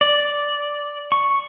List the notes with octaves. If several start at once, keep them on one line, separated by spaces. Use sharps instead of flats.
D5
C#6